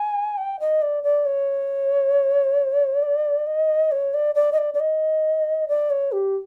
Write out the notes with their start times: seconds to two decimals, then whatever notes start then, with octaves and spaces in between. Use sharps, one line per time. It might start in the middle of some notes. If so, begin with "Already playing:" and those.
Already playing: G#5
0.38 G5
0.60 D#5
0.82 D5
1.04 D5
1.26 C#5
3.03 D5
3.47 D#5
3.92 C#5
4.14 D5
4.35 D5
4.53 D#5
4.58 D5
4.74 D5
4.80 D#5
5.68 D5
5.90 C#5
6.12 G4